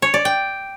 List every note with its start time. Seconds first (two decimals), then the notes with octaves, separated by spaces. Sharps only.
0.02 C#5
0.14 D5
0.25 G5